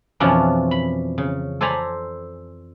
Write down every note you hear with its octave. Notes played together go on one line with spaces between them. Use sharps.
F2 B2 E3 F3 C#4 D4
B5
C#3
A4 C5 D5 G#5 A#5 B5